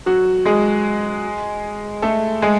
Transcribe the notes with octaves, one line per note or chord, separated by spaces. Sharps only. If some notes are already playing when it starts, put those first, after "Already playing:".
F#3 F#4
G#3 G#4
A3 A4
G#3 G#4